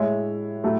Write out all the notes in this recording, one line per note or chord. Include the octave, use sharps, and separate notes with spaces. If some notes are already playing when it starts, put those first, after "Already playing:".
Already playing: A2 G#3 C#5 E5
A2 F#3 A3